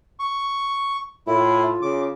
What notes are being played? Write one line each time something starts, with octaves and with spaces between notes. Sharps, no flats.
C#6
A2 E4 F4
C#3 D6